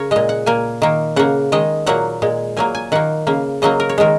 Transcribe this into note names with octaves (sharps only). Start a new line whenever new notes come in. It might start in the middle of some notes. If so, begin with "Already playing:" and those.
Already playing: C#3 A#4 C#5
A#2 G#3 D#5
F#5
A#2 A#3 G#5
D#3 A#3
C#3 A#3 F#5
D#3 G#3 D#5
A#2 F#3 A#3 F#5
A#2 G#3
A#2 F#3 A#3 G#5
G#5
D#3 A#3 F#5
C#3 A#3
C#3 F#3 A#3 D#5
A#4
C#5
D#3 G#3 A#4